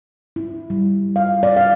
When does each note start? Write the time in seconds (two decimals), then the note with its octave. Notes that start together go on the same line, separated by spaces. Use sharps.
0.36 E4
0.70 G3
1.16 F5
1.43 D5
1.56 F5